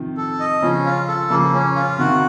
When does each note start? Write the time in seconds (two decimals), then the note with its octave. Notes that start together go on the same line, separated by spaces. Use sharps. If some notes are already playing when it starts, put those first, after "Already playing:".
Already playing: C3 D#3 F3
0.17 A4
0.40 D#5
0.62 C#3 F3 C#4
0.86 F4
1.08 A4
1.30 C#3 F3 A#3
1.54 C#4
1.76 F4
1.99 C3 D#3 F#4